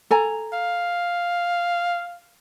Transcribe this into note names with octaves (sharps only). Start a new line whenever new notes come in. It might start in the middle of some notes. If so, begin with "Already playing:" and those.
A4 G#5 A#5
F5